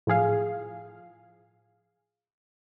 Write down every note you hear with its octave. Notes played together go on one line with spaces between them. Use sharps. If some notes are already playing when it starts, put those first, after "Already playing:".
A2 F3 G#4 F5